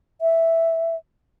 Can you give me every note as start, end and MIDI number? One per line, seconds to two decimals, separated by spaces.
0.21 0.96 76